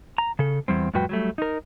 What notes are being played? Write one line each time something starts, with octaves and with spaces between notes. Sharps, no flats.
A#5
C#3 A4
E2 G3 C4
F2 A2 G3 F#4 B4 G5
F#3 G3 A3
D#4 A#4